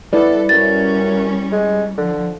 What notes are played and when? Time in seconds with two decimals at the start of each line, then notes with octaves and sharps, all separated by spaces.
0.13 G3 B3 E4 A4 B4 D5
0.49 F#2 G3 C#4 A6
1.52 G#3
1.97 D3 F3